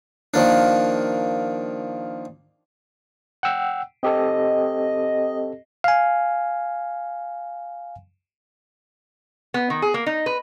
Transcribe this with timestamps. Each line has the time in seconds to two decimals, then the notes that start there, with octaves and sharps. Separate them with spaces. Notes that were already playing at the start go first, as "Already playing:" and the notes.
0.34 D#3 F3 A#3 D4
3.43 F#5 G5 E6
4.03 C4 G4 A4 D#5
5.84 F5 G#5
9.54 B3
9.70 D#3
9.82 G#4
9.94 A#3
10.06 D#4
10.26 B4